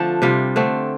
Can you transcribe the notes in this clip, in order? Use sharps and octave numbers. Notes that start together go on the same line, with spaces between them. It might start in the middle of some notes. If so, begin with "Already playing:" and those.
Already playing: D3 F3 A3 C4 D4 A4
C3 G3 F4
D3 A3 C4